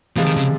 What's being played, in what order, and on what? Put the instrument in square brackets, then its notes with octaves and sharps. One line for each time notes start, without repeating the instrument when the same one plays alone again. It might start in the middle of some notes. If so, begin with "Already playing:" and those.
[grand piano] C3 F3 G#3 [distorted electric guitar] E3
[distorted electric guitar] D#3
C#3